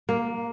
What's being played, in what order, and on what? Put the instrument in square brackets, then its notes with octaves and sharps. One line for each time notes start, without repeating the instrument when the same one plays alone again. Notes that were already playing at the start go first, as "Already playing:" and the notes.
[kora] A#3